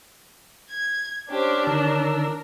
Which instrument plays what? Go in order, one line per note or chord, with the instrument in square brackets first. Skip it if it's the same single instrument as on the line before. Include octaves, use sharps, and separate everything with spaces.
[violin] G#6
[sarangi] C#4 [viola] D4 [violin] G4 C5
[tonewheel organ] D3 D#3 E6 [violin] A#4